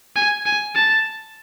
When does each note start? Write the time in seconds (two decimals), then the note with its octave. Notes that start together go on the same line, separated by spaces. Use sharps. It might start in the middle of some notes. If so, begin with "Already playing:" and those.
0.16 G#5
0.46 G#5
0.75 A5